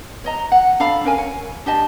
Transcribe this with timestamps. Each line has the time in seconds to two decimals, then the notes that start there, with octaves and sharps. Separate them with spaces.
0.24 C#5 D#5 A#5
0.52 F#5
0.80 D4 A4 F5 B5
1.05 C#4 A#4 G#5
1.18 C#5
1.66 D4 G4 D#5 A5